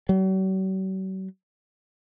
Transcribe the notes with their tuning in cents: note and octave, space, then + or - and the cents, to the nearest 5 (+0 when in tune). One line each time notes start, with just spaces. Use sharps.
F#3 +45